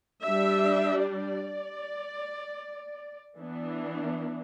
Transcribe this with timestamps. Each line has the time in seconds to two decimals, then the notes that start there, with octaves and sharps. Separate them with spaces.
0.23 G3 D4 E5
1.02 D5
3.37 E3 B3 D4